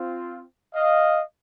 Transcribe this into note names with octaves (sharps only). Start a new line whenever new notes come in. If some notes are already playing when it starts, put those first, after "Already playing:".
Already playing: C4 F4
D#5 F5